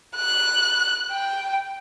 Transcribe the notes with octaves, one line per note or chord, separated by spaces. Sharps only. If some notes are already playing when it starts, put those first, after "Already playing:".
F#6
G5